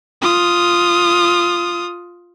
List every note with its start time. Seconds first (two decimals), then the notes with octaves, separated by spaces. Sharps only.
0.22 F4 D#6